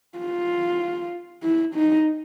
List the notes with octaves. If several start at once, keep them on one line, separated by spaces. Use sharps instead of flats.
F4
E4
D#4